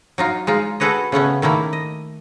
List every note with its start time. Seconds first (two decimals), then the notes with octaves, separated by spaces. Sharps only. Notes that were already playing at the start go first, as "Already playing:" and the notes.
0.18 F#3 D#4 F4
0.47 G#3 D#4 F4
0.80 F#4 G#4 A4 B4 C#5 D#5
1.12 C#3 A3 B3 C#4
1.42 D#3 A3 A#3 E4
1.73 D#5